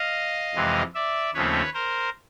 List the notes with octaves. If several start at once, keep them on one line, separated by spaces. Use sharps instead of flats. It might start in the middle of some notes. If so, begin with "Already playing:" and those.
Already playing: D#5 F5
F2 C3 E3 G#3
D5 E5
D#2 C#3 F3 A3 C4 B4 C#5
A#4 C5